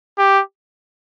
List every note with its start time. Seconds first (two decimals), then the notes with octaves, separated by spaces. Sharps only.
0.18 G4